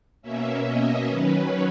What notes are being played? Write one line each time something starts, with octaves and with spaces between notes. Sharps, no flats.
B2 A#3 C#4 E5
D#5
D#3 F#3 C#4 B4